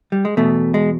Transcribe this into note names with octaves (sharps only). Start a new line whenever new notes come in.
G3
G#3
E2 B2 A3
G#3